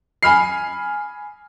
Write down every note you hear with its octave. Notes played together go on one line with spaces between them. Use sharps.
G#5 B5 F6 C7